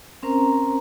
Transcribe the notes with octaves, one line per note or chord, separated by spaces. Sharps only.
C4 C#4 A#4 C5 A#5